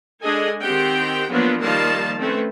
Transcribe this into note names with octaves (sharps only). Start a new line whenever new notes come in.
G#3 D4 G#4 A4 D#5 G#5
D#3 C4 G4 F#5 G5
F3 F#3 A#3 B3 D4 F4
D#3 F3 G3 A#3 F5 A5
A3 C4 C#4 B4